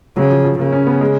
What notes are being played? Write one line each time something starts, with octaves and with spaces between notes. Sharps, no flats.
C#3 F#3
F3
F3
C#3 A#3
C#4
B3
G#3